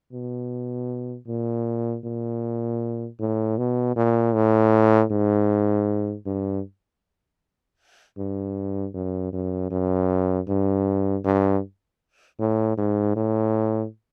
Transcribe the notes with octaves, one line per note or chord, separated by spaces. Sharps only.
B2
A#2
A#2
A2
B2
A#2
A2
G#2
G2
G2
F#2
F#2
F#2
G2
G2
A2
G#2
A2